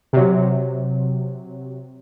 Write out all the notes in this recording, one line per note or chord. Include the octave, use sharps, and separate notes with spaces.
C3 F#3